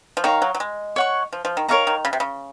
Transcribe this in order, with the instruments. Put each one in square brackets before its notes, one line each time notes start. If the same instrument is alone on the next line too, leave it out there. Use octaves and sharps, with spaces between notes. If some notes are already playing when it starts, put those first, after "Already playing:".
[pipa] F3
[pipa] D#3 [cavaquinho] C#5 F5 A#5
[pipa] F#3
F#3
G#3
[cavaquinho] C#5 F#5 C#6
[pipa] F3
F3
D#3
[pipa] D#3 [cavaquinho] A#4 C#5 F5 A#5
[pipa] D#3
C#3
C3
C#3